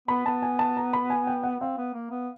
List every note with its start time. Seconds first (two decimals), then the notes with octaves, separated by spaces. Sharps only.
0.08 B3 B5
0.26 B3 A5
0.42 G#5
0.59 A5
0.77 A#5
0.93 B5
1.10 G#5
1.27 G5
1.43 F#5
1.60 C4 F5
1.78 B3
1.94 A#3
2.11 B3